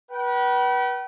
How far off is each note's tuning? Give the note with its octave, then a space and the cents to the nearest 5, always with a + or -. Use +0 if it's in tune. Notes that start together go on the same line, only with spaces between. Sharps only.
B4 -30 G5 -45